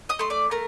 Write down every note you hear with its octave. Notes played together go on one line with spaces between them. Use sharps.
D#5 D#6
A3 C6
D5 D6
A3 A#4 A#5